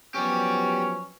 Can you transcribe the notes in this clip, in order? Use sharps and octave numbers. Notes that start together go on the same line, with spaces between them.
F3 F#3 B3 C#4 G4 D5